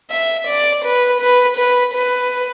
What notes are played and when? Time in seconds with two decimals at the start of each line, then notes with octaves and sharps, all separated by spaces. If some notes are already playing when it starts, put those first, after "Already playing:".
0.11 E5
0.47 D5
0.84 B4
1.20 B4
1.57 B4
1.93 B4